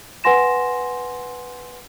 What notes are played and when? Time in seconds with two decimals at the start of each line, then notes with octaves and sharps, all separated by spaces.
0.24 B4 F#5 G#5 C6 A#6 E7